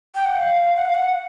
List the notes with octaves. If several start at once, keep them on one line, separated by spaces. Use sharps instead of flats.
G5
F#5
F5
F#5
F5
F#5